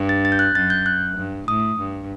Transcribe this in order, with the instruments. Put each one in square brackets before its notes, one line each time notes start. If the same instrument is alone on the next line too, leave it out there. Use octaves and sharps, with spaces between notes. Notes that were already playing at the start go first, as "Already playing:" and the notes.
Already playing: [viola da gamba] G2
[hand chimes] A6
A6
G6
F#6
[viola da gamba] F#2 [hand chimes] A6
[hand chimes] G6
F#6
[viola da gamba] G2
[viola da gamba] A2 [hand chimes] D#6
[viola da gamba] G2